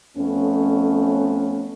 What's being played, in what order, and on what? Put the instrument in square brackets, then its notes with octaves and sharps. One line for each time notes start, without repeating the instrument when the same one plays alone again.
[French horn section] F2 A3 B3 C#4